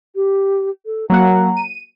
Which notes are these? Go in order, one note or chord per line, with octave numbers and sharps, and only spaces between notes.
G4
A4
F#3 A#3 F#5 A#5
D#7